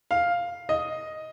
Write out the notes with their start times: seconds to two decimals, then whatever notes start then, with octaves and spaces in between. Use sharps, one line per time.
0.11 F5
0.69 D#5